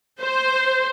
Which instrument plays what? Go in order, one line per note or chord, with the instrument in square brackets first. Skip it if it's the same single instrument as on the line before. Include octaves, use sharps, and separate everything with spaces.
[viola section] C5